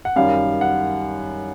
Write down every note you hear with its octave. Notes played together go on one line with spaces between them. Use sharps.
F#5
F#2 D#3 G3 F5
F#5